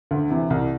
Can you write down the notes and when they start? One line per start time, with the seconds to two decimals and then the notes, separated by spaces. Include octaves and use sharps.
0.11 D2
0.30 C3 E3
0.50 C2